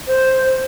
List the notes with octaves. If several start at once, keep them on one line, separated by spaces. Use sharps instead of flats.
C5